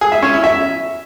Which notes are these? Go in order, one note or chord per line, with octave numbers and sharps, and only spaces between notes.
G#4
E5
C#4
E4
E5